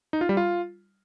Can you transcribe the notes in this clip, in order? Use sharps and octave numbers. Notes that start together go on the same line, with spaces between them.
D#4
F4
G3
F4